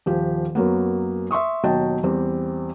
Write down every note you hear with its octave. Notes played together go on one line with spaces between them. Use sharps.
D#1 F3 G4
F#2 F#3 A#3 B3
E5 C6 C#6 D#6
D#2 B2 F#3 D#5 G5 A5
E2 G3 C4